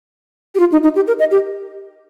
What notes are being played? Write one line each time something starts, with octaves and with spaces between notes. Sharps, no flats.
G4
F4
D#4
D#4
G4
A#4
D#5
G4